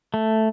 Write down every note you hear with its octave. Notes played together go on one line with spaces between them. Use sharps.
A3